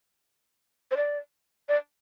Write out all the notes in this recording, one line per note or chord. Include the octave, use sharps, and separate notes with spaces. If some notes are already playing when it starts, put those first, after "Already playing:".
C5
D5
D5